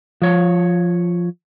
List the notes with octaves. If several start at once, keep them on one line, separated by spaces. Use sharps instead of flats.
F3 C#5